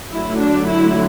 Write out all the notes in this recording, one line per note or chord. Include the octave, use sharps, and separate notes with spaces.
D3 F#3 A3 E4
D4
E4